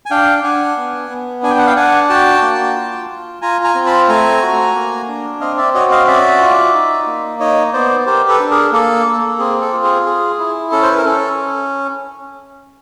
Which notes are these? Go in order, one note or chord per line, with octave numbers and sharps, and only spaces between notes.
G#5
D4 F5 G5
D4 F#5 G#5
B3
B3
D4 G#5
G5
F#5
F5 G5
D4 F#5 G#5
F#4 G5 A5
A#3
F4
F4
F4 G#5 A#5
G#5 A#5
C4
A5 B5
A3 G#5 A#5
F#4
A#3
D4
C4 D#5 F5
D5 E5
F#4 C#5 D#5
D#5 F5
C#4 D5 E5
F4
D#4
A#3
D#4 C#5 D#5
B3 C5 D5
G4 A#4 C5
A4 B4
D4
G#4 A#4
A#3 A4
A#3
C4 G#4
A4
F4
G#4
G#4
E4
C#4 A4
C5
B4
A#4
C#4 A4